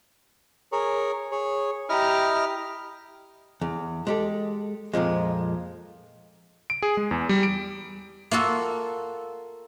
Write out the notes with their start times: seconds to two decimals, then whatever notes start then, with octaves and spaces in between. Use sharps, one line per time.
0.72 G#4 A#4 C#5
1.32 G#4 C#5
1.89 E4 G4 D#5 A#5 F6
3.61 E2
4.07 G#3 G4 A4
4.94 F2 A#2 F3 G#3
6.70 D7
6.82 G#4
6.97 G#3
7.11 E2
7.29 G3
7.43 D7
8.31 A#3 F4 F#4 A4